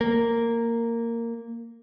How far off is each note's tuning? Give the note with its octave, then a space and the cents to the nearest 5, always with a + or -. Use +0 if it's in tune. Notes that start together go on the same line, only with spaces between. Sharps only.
A#3 -10